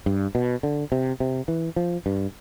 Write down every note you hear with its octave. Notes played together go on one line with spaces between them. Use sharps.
G2
B2
D3
C3
C3
E3
F3
G2